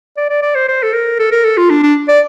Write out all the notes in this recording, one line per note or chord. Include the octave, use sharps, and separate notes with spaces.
D5
D5
D5
C5
C5
A4
A#4
A4
A#4
A4
F4
D4
D4
D5